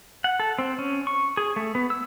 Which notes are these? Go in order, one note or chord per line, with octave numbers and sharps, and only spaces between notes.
F#5
A4
C4
C#4
C#6
G#4
A3
B3
E6